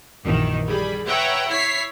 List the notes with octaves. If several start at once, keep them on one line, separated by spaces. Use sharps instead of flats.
A#1 F#2 D#3 E3
G3 G#4 B5
B4 C#5 E5 F#5 G5 A#5
E4 C#5 B6 C7